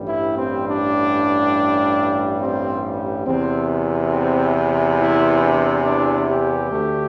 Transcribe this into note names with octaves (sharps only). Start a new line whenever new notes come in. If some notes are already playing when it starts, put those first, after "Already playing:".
Already playing: A1 G2 G3
E4
C4
D4
C4
E2 C3 E3 C4
C4
E4
D4
D4
G4
D2 D3 A3